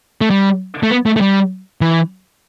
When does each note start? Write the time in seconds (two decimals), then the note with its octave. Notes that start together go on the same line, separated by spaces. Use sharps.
0.21 A3
0.30 G3
0.83 A3
0.91 B3
1.06 A3
1.16 A3
1.21 G3
1.81 E3